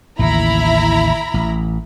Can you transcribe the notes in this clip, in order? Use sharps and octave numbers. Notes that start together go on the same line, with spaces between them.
A1 D#2 C#3 E4 A#5 B5
A1